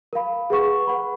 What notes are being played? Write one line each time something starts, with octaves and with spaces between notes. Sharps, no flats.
A#4 F5 B5
G#4 B4 F#5 C#6
B4 F#5 B5